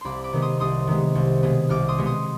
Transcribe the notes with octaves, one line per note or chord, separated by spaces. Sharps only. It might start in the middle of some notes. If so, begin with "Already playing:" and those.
C2 B5 C6 D6
B5 D6
C3 D#3 G#3 B3
C6 D#6
C2 C6 D#6
C3 D#3 G#3 B3
C2
B2 G#3 B3
C2 D6 F6
C6 D#6
B2 G#3 B3
C6 D#6